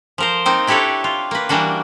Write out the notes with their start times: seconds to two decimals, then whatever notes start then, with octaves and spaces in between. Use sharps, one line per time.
0.18 F3 A#4 C5
0.45 A#3 C4 D#4
0.67 D4 E4 G4 A4 B4 C#5
1.04 F4
1.31 A#3 B4
1.49 E3 G3 A#3 D4 F#4